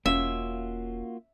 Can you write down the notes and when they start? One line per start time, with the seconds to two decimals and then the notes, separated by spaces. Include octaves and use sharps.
0.06 E1 A#3 C#4 F4 F#4 E5